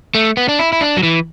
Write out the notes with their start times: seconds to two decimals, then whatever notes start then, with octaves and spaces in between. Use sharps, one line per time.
0.15 A3
0.37 B3
0.49 D4
0.59 E4
0.73 E4
0.81 D4
0.97 F#3
1.03 E3